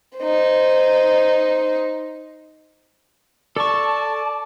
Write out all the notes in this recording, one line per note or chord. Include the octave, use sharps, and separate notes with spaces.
D#4 C5
A4 D5 A5 C#6